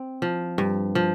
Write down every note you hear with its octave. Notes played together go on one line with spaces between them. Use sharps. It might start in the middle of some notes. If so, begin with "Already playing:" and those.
Already playing: C4
F3
G2
F3